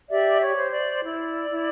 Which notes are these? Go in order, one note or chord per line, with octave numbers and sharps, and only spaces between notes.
G4 D5 E5
C#5
C5
D5
E4 D5
E4